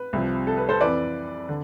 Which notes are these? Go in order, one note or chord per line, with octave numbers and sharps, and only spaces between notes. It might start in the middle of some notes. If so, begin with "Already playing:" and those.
Already playing: B4
C2 C3 F3
A4
B4
A4 C5
F2 E3 B4 D5
D3